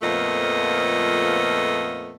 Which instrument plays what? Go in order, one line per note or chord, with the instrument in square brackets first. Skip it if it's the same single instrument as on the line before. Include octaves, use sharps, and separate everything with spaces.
[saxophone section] F2 A#2 F3 A3 B3 D#5